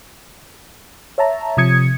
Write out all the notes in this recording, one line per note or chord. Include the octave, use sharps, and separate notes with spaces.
C#5 E5 A5 A#5
C3 F3 D#6 G#6 C#7